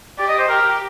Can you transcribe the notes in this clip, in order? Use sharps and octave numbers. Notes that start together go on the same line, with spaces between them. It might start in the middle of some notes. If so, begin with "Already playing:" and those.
G4 D5
D#5
C5
G4 A#4